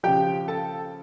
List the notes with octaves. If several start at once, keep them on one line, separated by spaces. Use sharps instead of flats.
C#3 F3 G4 G5
A4 A5